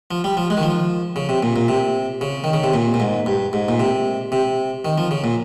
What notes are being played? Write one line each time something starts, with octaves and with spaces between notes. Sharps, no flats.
F3
G3
F3
G#3
D#3
F3
C#3
C3
A#2
A#2
C3
C#3
D#3
C#3
C3
A#2
A#2
G#2
G2
G#2
A#2
C3
C3
D#3
F3
C#3
A#2